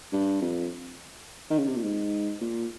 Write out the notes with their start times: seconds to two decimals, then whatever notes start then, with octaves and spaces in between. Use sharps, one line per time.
0.13 G2
0.41 F2
1.50 D#3
1.58 C#3
1.67 C3
1.76 A#2
1.84 G#2
2.41 A#2